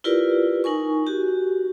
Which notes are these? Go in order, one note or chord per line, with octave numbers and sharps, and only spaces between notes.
E4 F4 G4 A#4 B4 D5
D#4 A#4 G#5 C#6
F#4 G4